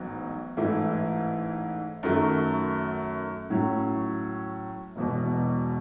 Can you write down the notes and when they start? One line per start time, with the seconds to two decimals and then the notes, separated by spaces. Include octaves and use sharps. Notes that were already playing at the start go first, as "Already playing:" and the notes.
Already playing: A1 G#2 F#3 B3
0.57 A1 G#2 E3 A3 E4
2.03 F#2 D#3 F#3 A3
3.50 A2 F#3 C#4
4.96 E1 E2 B2